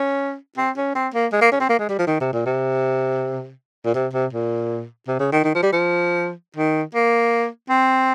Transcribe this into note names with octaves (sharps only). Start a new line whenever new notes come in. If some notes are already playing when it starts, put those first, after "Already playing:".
Already playing: C#4
C4
C#4
C4
A#3
G#3
A#3
C#4
C4
A#3
G#3
G3
F3
D#3
C3
A#2
C3
A#2
C3
C3
A#2
C3
C#3
D#3
D#3
F3
G3
F3
D#3
A#3
C4